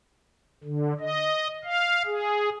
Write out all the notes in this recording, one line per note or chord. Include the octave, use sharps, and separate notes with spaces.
D3
D#5
F5
G#4